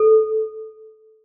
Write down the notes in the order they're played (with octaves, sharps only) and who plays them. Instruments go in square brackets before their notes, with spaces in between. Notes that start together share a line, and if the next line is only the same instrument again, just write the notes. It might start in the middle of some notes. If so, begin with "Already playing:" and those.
Already playing: [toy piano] A4